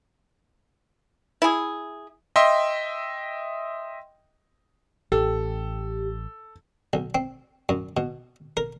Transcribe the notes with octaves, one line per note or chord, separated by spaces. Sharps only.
E4 G#4
D#5 E5 G5 C6
A1 G4 A4
B1
C4
F#2
B2
A#4